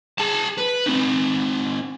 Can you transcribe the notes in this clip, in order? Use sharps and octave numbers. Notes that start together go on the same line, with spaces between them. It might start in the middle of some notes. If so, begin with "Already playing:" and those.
G#4 A5
B4
C4 D#4